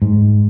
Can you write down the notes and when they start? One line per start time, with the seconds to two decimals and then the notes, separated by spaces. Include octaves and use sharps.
0.02 G#2